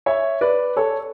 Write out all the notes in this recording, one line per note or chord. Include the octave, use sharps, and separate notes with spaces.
C#5 E5
B4 D5
A4 C#5